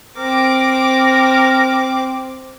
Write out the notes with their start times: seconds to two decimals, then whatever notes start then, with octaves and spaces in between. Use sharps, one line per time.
0.17 C4 A#4 D6